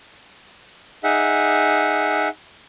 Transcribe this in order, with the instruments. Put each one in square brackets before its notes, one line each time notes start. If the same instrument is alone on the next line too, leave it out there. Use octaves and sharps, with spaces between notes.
[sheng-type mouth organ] D#4 G#4 E5 F#5